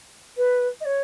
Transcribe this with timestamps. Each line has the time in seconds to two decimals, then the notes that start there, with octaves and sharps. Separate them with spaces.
0.36 B4
0.80 D#5
0.85 C#5